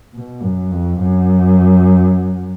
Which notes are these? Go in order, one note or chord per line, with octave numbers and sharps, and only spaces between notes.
B2
F#2
F2
F#2